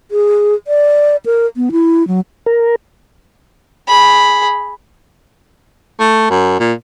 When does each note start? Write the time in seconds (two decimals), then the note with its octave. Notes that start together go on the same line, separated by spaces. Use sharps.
0.11 G#4
0.67 D5
1.26 A#4
1.56 B3
1.72 E4
2.07 F#3
2.46 A#4
3.88 G#4 B5
6.00 A3
6.30 F#2
6.60 A#2